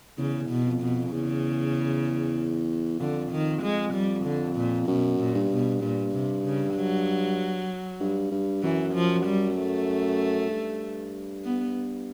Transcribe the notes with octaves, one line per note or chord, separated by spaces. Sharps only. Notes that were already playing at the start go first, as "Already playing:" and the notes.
E2 C#3
B2
F2
B2
E2 C#3
F2 D3
D#3
G#3
G3
D3
A#2
F#2 B2
A#2
G2
B2
G2 A#2
C3
C#3
F#3
G2
G2
F#2 E3
F3
G3
A3
G2
B3